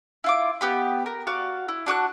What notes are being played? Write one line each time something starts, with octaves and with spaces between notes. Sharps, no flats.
E4 F4 D6
B3 G4 B5
A#4
F#4 D5 F5
E4
D4 F#4 D6 F#6